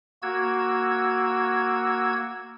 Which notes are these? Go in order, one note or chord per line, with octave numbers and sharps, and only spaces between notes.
A#3 F#4 E6 G#6